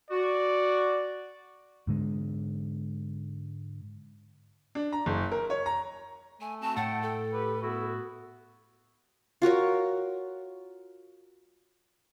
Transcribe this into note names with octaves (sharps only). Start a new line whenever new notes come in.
F#4 D5
G#2 D3 G#3
D4
A#5
F#1
A#4
C#5
A#5
A3 G#5
C4 F#4 A5
A2 F#5 G5 A5
A4
G4 B4
B3 E4 F#4
F4 F#4 A#4 C#5